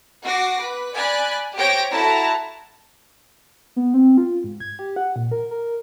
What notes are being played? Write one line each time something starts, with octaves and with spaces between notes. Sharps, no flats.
F#4 D6 A#6 C7
B4
D5 G#5 B5 F#6
G4 C5 C#5 G5 A#6 D7
E4 F#4 A4 A5 A#5
B3
C4
F4
G#2
G#6
G4
F#5
A#2
A#4
A#4